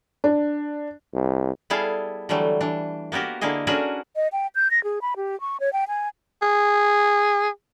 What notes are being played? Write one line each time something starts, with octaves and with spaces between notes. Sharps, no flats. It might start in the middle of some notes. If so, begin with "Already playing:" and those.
D4
C2
G3 B3 E4 G#4 A4 F5
D3 E3 F#3 G3 A3
E3 D4
A#3 B3 F#4 G4 A#4
D3 A#3 E4 G#4 D#5
C#4 D4 F#4 G#4 A#4 B4
D#5
G5
G6
A#6
G#4
B5
G4
C#6
C#5
G5
G#5
G#4